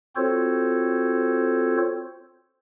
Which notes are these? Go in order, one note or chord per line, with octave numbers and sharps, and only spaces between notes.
C4 F4 F#4 A4 C5 C#5